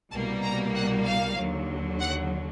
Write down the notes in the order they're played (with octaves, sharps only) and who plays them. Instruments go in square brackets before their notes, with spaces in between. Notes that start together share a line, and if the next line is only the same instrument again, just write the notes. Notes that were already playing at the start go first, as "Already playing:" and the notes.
[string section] C2 B2 G3 A#3 A5
A#5
F#5
F5
D#2 D3 F#3
F#5